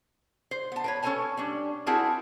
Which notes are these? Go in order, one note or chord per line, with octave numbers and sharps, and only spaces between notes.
C5
B3 A5
A#4 B4 C#5
C#4 A4 A#4 C#5 G#5 A5
G3 C#4 D4
C4 E4 F#4 G#4 A#4 A5